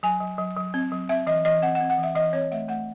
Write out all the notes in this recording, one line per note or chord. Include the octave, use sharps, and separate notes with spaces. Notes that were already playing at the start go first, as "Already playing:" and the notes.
F#3 G#5
F#3
F#3
F#3
C4
F#3
C4 E5
E3 D#5
E3 D#5
C4 F#5
F#5
C4
F#5
E3 E5
E3 D#5
C4 C#5
A3 E5
A3 F#5